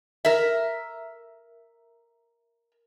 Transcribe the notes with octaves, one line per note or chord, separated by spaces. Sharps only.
A#4 E5